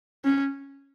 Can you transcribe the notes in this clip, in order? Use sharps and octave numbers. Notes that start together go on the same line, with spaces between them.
C#4